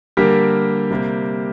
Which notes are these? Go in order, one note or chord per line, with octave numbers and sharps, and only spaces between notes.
D3 G3 A#3 G4 A#4
C3 G3 A#3